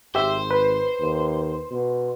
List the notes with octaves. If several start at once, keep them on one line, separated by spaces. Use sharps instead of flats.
G#1 G4 C5 E5
B4
D#2
B2